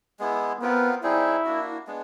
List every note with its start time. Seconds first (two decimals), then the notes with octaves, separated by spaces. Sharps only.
0.19 G#3 B3 E4
0.61 B3 C4 F4 A#4
1.03 G3 C4 D#4 E4 G#4
1.45 A#3 D4 F#4
1.87 G#3 B3 D4